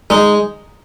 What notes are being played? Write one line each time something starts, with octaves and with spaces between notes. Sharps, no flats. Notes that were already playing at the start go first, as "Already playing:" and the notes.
G#3 D#4